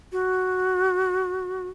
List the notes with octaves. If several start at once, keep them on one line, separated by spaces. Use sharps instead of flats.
F#4